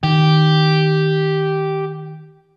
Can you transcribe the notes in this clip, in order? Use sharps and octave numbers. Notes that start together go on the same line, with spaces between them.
D#3 G4